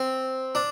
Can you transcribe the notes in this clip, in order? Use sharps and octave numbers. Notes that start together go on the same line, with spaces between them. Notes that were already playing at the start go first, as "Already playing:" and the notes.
Already playing: C4
D4